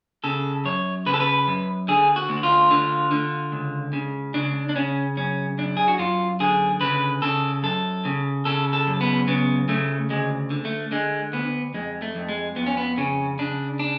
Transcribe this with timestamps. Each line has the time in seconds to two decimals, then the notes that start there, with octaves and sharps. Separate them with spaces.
0.24 C#3 A4
0.65 F#2 C#5
1.06 C#3 B4
1.14 A4
1.20 B4
1.47 F#2
1.88 D3 G#4
2.16 F#4
2.29 D2
2.43 F4
2.71 D3
3.11 D3
3.52 C#2
3.93 C#3
4.34 C#3 D4
4.69 D4
4.76 C#3 C#4
5.17 F#2 C#4
5.58 F#2 D4
5.77 G#4
5.88 F#4
5.99 F#2 F4
6.40 D3 G#4
6.81 C#3 B4
7.22 C#3 A4
7.63 F#2 A4
8.05 C#3
8.45 C#3 A4
8.73 A4
8.87 F#2
9.01 B3
9.28 C#3 B3
9.69 C#3 A3
10.10 D2 G#3
10.50 D3
10.65 A3
10.92 D3 G#3
11.33 D2 B3
11.74 F2 G#3
12.02 A3
12.15 F2
12.29 G#3
12.56 F2 B3
12.66 C#4
12.77 B3
12.98 C#3 C#4
13.39 C#3 D4
13.79 D4